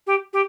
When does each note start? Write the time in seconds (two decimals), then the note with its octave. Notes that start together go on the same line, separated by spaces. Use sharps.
0.07 G4
0.33 G4